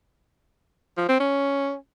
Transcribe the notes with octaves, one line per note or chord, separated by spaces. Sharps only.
F3
C4
C#4